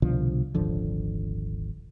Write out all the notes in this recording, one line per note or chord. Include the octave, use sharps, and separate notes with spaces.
C2 B2 D3 F3
D#1 G#1 D3 F3